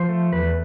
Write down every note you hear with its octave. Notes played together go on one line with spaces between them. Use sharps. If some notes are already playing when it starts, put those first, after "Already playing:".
Already playing: F3 C5
A3
E2 B4